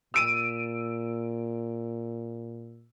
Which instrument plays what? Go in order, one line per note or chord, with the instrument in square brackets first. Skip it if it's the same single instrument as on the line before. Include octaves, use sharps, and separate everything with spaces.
[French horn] A#2 [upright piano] E6 D7 D#7